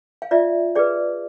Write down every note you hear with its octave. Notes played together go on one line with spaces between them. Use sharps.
F5
F4 D5 E5
G#4 B4 D5